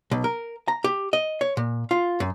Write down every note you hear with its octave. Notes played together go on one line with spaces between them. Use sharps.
B1
A#4
A#5
G4
D#5
C#5
A#2
F4
F#2